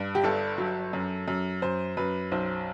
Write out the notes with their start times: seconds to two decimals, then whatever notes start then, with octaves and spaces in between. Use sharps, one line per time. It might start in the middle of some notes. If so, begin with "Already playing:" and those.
Already playing: G2
0.15 G4
0.24 G1 A4
0.58 F#3
0.93 F#2
1.28 F#2
1.62 F#2 C5
1.97 F#2 B4
2.32 B1 C5